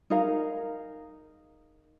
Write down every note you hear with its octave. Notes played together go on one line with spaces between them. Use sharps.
D#4 G#4 A#4 F5